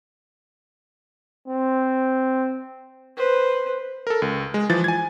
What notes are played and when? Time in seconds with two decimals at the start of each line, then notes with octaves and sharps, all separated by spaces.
1.48 C4
3.17 B4 C5
4.07 A4 A#4
4.22 C#2
4.54 G#3
4.70 E3 F3 A6
4.84 G#5 G#6